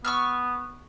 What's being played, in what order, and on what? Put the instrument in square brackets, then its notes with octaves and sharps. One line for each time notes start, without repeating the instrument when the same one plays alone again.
[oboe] B3 [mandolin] C#6 E6 F6